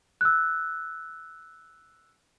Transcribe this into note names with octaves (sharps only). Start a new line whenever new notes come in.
E6 F#6